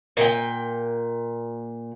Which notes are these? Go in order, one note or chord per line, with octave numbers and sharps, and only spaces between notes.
A#2 G5